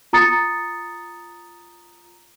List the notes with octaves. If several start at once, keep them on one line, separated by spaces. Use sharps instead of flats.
F4 A#5 D#6 A6 C#7